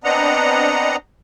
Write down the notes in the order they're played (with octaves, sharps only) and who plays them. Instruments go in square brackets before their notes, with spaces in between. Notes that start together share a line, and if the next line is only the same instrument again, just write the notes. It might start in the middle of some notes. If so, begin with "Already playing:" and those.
[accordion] B3 C4 D4 D#5 F#5 A#5